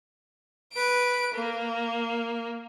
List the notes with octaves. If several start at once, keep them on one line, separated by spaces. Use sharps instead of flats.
B4 D7
A#3